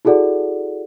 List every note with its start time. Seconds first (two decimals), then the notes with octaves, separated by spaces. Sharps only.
0.05 E4 F#4 G#4 A4 D5 F#5